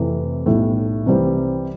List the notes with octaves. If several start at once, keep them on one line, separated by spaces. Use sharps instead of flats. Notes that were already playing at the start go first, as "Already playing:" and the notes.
Already playing: F2 C3 E3 A3
B1 A2 G3
C2 C3 E3 G3 C4